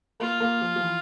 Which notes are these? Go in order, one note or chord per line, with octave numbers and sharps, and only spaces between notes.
A#3 F4
A#3
F3
F3
E3